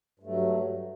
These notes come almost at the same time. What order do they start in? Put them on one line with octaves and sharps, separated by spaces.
G2 A3 F#3